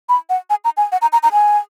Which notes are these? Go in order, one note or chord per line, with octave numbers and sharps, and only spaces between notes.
B5
F#5
G#5
A#5
G#5
F#5
A#5
A#5
A#5
G#5